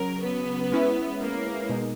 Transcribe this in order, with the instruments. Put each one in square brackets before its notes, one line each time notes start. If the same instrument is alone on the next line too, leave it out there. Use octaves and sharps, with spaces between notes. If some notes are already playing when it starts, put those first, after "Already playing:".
Already playing: [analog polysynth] C#3 F#3 C#4 [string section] A#4
[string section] B3
[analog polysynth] G#3 C#4 E4 B4
[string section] A#3
[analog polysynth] B2 G#3 D#4